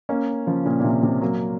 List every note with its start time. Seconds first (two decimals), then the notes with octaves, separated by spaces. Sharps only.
0.09 A#3 C#4
0.47 C#3 F3
0.65 A#2 C#3
0.80 A#2
0.84 C3
1.03 C3
1.21 F#3 A#3